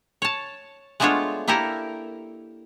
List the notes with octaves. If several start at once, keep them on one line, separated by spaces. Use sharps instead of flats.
C#5 A5
G#3 A3 B3 D4 F4 C#5
A#3 E4 G4 A4 A#4